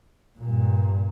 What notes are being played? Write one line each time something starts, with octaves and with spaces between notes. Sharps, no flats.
G2 A#2